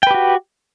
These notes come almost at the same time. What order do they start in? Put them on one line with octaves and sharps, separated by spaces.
G5 B4 G4 F#4